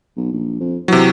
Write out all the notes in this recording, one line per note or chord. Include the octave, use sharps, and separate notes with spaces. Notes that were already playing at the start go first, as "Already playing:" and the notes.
B1
A#1
F2
C3 E3 F#3